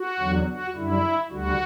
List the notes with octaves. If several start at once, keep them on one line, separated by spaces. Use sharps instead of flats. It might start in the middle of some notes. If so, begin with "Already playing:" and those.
Already playing: F#4
E2 D3 F#3
F#4
F#2 D3 G3 E4
D2 D3 G3 F#4